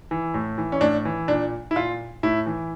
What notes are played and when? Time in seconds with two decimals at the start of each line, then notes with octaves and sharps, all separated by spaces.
0.11 E3
0.34 A2
0.58 E3
0.72 C#4
0.81 A2 D4
1.05 E3
1.28 A#2 D4
1.71 E4
1.76 A#2 F4
2.23 A2 E4
2.46 E3